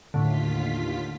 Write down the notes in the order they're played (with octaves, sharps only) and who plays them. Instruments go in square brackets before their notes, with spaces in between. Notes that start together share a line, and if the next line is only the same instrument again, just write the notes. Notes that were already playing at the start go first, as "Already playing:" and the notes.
[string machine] D#2 F4 B6 [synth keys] A2 D3